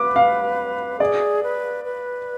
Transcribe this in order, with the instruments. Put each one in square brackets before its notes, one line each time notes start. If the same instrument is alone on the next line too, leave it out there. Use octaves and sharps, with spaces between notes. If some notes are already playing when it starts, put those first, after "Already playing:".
Already playing: [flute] B4 [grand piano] D6
[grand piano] F5
[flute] G#4 [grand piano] D5
[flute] B4
B4